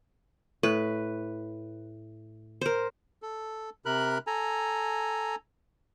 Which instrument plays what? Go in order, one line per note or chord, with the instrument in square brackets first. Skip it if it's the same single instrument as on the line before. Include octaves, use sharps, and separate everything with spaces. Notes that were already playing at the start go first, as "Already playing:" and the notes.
[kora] A2 [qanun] B4
[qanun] A#4 C5
[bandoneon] A4
C3 A#4 B5 F#6
A4 G#5 A#5